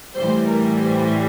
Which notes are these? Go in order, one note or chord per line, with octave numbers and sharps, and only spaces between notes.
A2 E3 G3 C5
A#4
C5